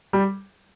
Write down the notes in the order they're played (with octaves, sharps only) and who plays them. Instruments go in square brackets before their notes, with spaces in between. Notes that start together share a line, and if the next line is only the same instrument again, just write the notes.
[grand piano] G3